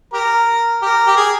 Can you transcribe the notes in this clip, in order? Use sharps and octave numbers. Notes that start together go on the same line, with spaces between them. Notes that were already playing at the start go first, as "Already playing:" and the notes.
G4 A#4
G4 A#4
G4
G#4